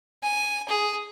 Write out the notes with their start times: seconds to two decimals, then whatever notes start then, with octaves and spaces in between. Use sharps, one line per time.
0.23 G#5
0.69 G#4